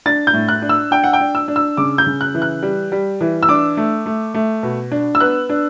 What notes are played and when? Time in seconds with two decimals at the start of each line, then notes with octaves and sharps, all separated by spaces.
0.06 D4 A6
0.27 G6
0.33 A2
0.49 F#6
0.62 D4
0.69 E6
0.91 D4 G5
1.04 F#5
1.13 G5
1.20 D4
1.35 E6
1.48 D4
1.56 E6
1.77 C#3 D6
1.98 G6
2.06 C#3
2.21 F#6
2.35 E3
2.42 F#6
2.63 G3
2.92 G3
3.21 E3
3.43 E6
3.49 D4 D6
3.77 A3
4.06 A3
4.34 A3
4.63 B2
4.92 D4
5.15 E6
5.20 B3 F#6
5.49 D4